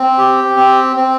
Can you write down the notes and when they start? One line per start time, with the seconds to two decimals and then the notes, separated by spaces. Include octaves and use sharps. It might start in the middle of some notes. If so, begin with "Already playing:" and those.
Already playing: C4
0.18 G4
0.56 C4
0.96 C4